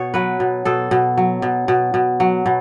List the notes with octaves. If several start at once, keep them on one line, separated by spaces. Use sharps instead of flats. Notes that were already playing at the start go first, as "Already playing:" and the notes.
Already playing: B2 C#5
F#3 B4
B2
B2 A4
B2
F#3
B2
B2
B2
F#3
B2